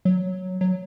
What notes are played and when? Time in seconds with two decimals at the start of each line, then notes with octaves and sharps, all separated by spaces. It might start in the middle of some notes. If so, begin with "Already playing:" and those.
0.05 F#3
0.61 F#3